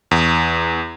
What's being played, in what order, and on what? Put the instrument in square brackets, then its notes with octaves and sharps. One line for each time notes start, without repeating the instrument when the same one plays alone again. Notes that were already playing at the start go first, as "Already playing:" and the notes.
[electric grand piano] E2